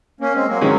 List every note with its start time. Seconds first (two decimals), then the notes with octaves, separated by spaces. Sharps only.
0.20 A#3 C#4
0.34 G#3 C4
0.48 F#3 A#3
0.61 D#3 F#3 G#3 C#4 G#4